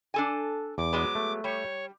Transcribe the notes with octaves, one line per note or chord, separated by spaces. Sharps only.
D4 A4 G#5
E2 D6
F#3 G#3 B3
A3
G3 C#5